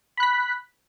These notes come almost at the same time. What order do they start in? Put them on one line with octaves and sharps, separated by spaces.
B5 F#6 B6